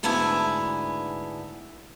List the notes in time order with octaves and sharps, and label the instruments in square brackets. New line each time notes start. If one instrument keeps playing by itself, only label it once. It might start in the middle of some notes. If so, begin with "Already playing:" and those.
[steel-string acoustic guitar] D2 G#2 B3 D4 E4 G#5